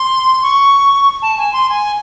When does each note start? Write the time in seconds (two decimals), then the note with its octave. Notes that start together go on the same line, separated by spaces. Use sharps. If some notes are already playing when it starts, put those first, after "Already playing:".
Already playing: C6
0.43 C#6
1.22 A5
1.38 G#5
1.53 C6
1.69 G#5